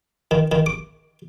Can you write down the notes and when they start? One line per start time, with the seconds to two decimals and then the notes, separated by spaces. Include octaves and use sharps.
0.31 D#3
0.52 D#3
0.66 D6